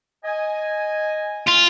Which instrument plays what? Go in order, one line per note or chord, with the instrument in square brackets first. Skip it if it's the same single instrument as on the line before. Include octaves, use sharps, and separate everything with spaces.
[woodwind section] D#5 G#5
[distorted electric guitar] F4